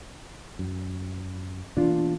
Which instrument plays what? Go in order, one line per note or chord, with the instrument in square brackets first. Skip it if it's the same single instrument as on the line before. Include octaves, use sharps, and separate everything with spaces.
[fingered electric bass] F#2
[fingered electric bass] B2 E3 A#3 [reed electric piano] D4 F4